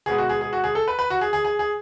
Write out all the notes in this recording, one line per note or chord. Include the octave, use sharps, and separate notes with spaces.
B2 G#3 B3 G#4
F#4
G#4
G#4
F#4
G#4
A4
B4
B4
F#4
G#4
G#4
G#4
G#4